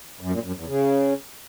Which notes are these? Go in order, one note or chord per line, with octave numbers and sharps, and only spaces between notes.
F#2
A#2
F#2
E2
C#3